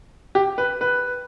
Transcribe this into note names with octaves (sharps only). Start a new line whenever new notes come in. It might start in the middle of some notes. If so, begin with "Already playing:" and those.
G4
B4
B4